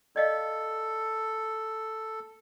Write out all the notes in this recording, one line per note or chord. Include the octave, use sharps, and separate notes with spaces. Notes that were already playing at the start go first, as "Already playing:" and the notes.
A4 D5 D#5 F5